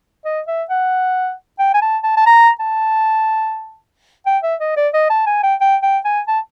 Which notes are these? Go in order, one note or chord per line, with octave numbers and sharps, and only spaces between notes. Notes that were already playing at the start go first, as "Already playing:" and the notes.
D#5
E5
F#5
G5
G#5
A5
A5
A5
A#5
A5
G5
E5
D#5
D5
D#5
A5
G#5
G5
G5
G5
G#5
A5